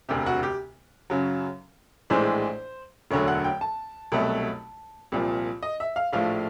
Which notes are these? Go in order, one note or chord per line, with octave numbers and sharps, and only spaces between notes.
E1 D2 C3 G4
F#4
G4
F#2 C#3 F#3
A#1 A2 E3 G#3 C5
E1 D2 D3 F#3 A3 C#5
F#5
G5
A5
C2 B2 F#3 A3
C2 A#2 F3
D#5
E5
F5
A#1 A2 F3 A3 F5